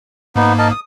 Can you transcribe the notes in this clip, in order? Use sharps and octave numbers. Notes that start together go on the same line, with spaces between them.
G#2 A#3 B3 D#4
A#4 D#5 A5
D#6